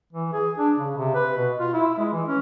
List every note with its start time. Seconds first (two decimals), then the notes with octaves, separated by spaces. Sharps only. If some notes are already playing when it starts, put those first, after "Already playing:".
0.13 E3
0.33 G#4
0.58 D4
0.77 C#3
0.97 C3
1.15 B4
1.37 B2
1.60 F4
1.74 E4
1.98 G#3
2.13 E3
2.28 C#4